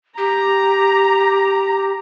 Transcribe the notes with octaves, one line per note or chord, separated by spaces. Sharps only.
G4 A#5